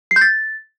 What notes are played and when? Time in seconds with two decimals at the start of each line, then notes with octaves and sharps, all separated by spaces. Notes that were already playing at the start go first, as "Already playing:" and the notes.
0.11 C7
0.16 G6
0.21 A6